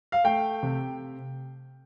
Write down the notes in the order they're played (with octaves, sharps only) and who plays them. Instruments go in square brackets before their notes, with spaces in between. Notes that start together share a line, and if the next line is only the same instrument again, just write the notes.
[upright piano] F5
[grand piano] A3 [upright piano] G5
[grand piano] C3